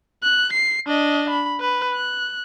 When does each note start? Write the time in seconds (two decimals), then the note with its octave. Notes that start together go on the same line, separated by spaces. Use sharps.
0.24 F#6
0.53 C7
0.87 D4 D#5
1.30 B5
1.61 B4
1.94 F#6